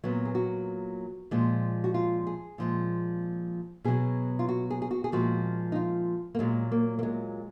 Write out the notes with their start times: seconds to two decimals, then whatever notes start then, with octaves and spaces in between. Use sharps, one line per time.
0.04 A#2 F#3 B3
0.25 G#4
0.35 F#4
1.31 A#2 F3 G#3
1.84 F#4
1.94 F4
2.27 G#4
2.58 A#2 F3 G#3
3.84 B2 F#3 G#4
4.39 F4
4.49 F#4
4.70 G#4
4.82 G#4
4.91 F#4
5.04 G#4
5.12 A#2 F3 G#3 F#4
5.72 D#4
5.76 F4
6.35 A#3
6.39 A#2 F#3 G#3
6.72 A#3
6.99 A#3
7.03 G#3